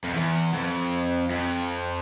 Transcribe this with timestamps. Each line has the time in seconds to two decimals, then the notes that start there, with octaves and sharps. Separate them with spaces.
0.04 F2
0.14 E2
0.54 F2
1.31 F2